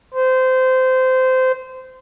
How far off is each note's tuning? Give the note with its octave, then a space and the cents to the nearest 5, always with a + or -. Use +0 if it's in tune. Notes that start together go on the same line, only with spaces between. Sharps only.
C5 -20